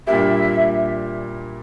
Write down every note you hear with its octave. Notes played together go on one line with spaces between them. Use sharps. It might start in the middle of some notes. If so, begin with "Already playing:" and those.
A#2 G3 A#3 D4 G4 E5